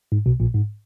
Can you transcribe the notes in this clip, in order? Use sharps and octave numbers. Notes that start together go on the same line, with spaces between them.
G#2
B1 B2
A#1 A#2
G#2